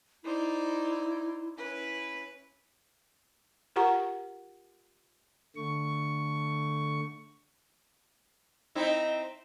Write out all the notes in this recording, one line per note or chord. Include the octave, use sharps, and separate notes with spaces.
D#4 E4 C5 D5
C#4 E4 B4
F4 G4 A#4 F#5 A#5 C#6
D3 A3 C#6
C4 D#4 E4